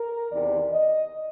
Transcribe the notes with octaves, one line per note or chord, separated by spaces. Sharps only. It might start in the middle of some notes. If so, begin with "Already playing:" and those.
Already playing: A#4
E2 C3 D#3 D5
D#5